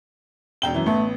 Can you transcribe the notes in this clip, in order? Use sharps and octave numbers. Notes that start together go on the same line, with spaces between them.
E1 G5 G7
F#2 E3
A1 A3 B3